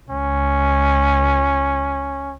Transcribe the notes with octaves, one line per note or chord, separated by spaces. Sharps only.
C#2 C#4